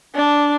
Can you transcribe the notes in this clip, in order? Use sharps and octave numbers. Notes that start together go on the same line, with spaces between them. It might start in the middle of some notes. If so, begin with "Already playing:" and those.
D4